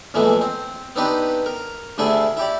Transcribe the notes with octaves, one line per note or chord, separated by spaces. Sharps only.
F2 A#2 E3 G#3 A3 B3
C4
B3 C4 D4 D#4 G4 B4
A#4
D2 C3 A3 E4 G#4 D5
E4 G4 D5